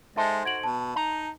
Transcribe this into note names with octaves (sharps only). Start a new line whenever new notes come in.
G#3 D#4 A4 C5 E5 A5
F#4 G#6 D7 F#7
B2 A5
D#4 A#5